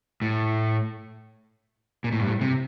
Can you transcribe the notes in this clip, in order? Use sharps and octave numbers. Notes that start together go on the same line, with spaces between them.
A2
A#2
A2
G2
A2
C3